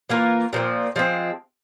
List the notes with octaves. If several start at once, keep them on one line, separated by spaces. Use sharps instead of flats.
E3 A#3 F4 A#4
A#2 F3 C4
F3 G#3 C4